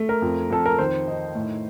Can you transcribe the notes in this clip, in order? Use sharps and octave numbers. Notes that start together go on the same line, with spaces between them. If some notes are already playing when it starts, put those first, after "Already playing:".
Already playing: A3
A#4
F2
F2 A4
A#4
D#3 C5
D#4
A2